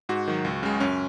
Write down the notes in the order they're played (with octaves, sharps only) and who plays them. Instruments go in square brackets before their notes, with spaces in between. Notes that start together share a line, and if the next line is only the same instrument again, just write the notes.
[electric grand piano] G#2 F#4
D#3 F#3
C#2
C#3 G#3
F#2 C#4